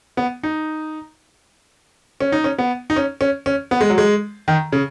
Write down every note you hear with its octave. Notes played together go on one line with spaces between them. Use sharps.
B3
D#4
C#4
D#4
C#4
B3
D#4
C#4
C#4
C#4
B3
G#3
F#3
G#3
D#3
C#3